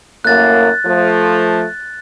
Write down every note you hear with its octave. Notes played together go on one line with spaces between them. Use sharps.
F#2 A2 A#3 F#6 A6
F3 A3